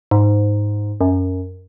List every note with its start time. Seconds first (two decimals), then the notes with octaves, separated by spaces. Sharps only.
0.11 G#2
1.01 F#2